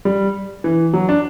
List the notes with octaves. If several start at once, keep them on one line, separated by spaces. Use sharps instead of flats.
G3
E3
F#3
D4